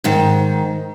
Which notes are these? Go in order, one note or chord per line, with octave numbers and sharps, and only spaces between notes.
G#2 D#3